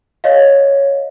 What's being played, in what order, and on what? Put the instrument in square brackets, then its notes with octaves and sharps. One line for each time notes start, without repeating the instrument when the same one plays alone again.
[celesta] C#5 D#5 F5